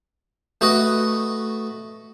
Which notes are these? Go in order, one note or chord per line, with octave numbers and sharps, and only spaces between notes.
A3 F#4 B4 D#5 F#5